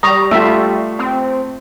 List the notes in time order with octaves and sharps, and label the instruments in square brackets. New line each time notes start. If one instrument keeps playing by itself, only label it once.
[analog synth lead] G3 [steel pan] A#5 [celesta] C#6 D#6
[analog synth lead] G3 [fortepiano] A3 [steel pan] F4 E5
[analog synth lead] C4